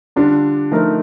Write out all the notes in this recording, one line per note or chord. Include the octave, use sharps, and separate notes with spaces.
D3 G3 D4 F4
F3 A3 D#4 A#4